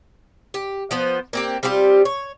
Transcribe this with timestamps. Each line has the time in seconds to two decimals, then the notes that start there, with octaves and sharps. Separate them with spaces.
0.54 G4
0.91 F3 B3 C5
1.33 A#3 C4 G4
1.63 G3 C4 F4 G4
2.05 C#5